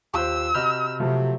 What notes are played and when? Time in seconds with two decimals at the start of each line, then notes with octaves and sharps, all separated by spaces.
0.14 D#2 F4 G4 C5 E6 F#6
0.54 C3 F#4 D#5 B5 F6 G6
1.00 C3 F3 F#3 A3